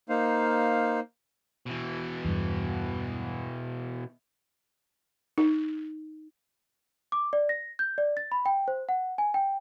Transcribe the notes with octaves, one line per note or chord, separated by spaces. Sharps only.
A#3 D#4 C5 F5
B2 E3
E2 G2
D#4
D6
D5
A#6
G6
D5
A6
B5
G5
C5
F#5
G#5
G5